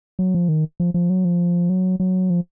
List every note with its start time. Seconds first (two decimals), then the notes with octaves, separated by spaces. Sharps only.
0.19 F#3
0.35 F3
0.49 D#3
0.80 F3
0.94 F3
1.10 F#3
1.25 F3
1.70 F#3
2.00 F#3
2.30 F3